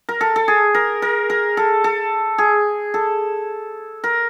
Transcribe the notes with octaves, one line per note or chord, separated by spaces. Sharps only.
A#4
A4
A4
G#4
A#4
A#4
A#4
A4
A4
G#4
A4
A#4